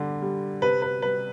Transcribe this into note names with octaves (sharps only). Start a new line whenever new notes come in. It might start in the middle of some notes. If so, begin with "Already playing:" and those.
Already playing: D3 G3
G3
C3 B4
B4
G3 B4